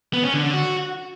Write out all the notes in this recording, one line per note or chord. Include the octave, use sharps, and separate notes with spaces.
B3
C#4
D3
D3
F#4